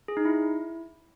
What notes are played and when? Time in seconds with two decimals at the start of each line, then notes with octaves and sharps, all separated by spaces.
0.08 G#4
0.17 D#4
0.25 E4